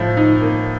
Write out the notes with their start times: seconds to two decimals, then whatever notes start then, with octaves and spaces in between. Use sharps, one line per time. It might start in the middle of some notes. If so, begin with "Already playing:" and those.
Already playing: A2 F3 A3
0.17 D#4
0.41 A#3